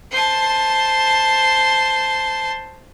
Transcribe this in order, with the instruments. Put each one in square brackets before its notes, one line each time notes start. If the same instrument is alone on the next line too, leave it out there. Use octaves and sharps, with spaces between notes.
[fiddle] C5 A5